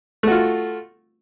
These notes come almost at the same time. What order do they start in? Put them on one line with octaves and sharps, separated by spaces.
A3 F#4 F4